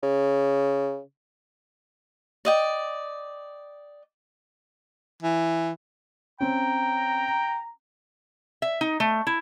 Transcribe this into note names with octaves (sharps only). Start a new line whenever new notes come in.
C#3
D5 D#5 G5
E3
C4 C#4 G5 A#5
E5
D#4
A3
E4